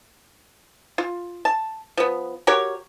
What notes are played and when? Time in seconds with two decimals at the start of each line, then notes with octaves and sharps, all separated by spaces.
0.98 F4
1.45 A5
1.97 F3 B3
2.47 F#4 G4 A#4 C#5